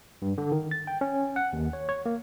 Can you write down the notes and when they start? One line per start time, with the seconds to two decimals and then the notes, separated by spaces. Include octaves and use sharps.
0.22 G2
0.38 D3
0.52 D#3
0.71 A6
0.87 G5
1.01 C#4
1.36 F#5
1.53 D#2
1.73 C#5
1.89 C#5
2.06 A#3